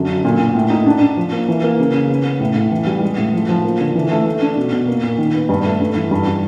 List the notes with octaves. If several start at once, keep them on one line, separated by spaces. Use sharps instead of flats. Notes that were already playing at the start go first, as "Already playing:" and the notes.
Already playing: F#2 D3
F#3
A#2
A#2
A2
D#4
D4
D4
F3
A#3
E3
A#3
C#3
C#3
B3
B3
A2
A2
E3
G3
G#3
A2
F3
F3
A#3
D3
E3
A3
A3
D4
B2
B2
A#3
A#2
D#3
B3
G2
A3
G2
E3
G2
G3